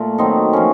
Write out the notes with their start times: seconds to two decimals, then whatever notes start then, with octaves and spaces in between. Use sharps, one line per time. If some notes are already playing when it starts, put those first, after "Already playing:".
Already playing: A#2 A3 F4
0.18 D#3 F#3 C4 D#4
0.53 F3 A#3 C#4